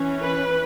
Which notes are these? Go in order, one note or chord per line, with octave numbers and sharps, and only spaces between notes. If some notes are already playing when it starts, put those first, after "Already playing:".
Already playing: E3 C#4
B4